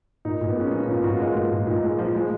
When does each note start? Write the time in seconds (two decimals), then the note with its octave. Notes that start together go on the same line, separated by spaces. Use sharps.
0.25 A#2 D#4
0.41 A#2
0.48 B3
0.56 G#3 C#4
0.71 F3 C#4
0.84 A#2 C#4
0.96 F4
1.03 A#2 F#4
1.07 F4
1.20 G#3
1.35 A#2
1.51 A#2
1.67 A#2 D#4
1.83 G#3
1.99 F3
2.14 G#3